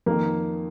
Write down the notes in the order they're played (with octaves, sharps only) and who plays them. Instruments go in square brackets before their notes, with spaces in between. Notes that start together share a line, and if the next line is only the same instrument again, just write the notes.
[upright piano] F2 D#3 A#3